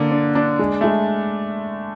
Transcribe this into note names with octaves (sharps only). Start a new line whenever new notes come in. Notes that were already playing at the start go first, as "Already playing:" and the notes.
Already playing: D3 A#3 D4
D4
D4
G#3
G#3 A3